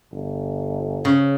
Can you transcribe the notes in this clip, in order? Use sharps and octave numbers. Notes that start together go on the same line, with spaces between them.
G1
C#3